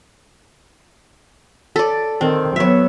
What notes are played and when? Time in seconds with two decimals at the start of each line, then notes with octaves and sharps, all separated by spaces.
1.76 A4 D5
2.21 D#3 C4
2.56 F#3 B3 C#5 E5